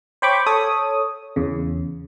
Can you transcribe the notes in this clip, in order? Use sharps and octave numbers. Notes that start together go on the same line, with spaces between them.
C5 C#5 G5 B5 C#6 D6
A4 C#5 D#6
E2 C#3